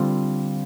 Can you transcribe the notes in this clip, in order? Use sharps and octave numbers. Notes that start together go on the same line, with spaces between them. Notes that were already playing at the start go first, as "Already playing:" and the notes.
Already playing: D3 G3 C4 F4